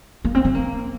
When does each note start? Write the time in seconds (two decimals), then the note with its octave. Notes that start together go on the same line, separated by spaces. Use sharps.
0.25 A#3
0.35 C4
0.45 C4
0.55 A#3